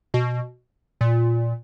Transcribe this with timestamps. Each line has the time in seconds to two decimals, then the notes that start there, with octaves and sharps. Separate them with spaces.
0.14 B2
1.01 A#2